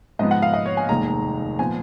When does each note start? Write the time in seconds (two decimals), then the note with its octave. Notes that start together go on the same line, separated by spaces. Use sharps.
0.19 G#2 F3 B3 D#5
0.31 F#5
0.42 F5
0.54 D#5
0.66 C#5
0.77 G#5
0.88 F1 D#2 D#3 G#3 A#5
1.59 A#2 F3 B3 G#5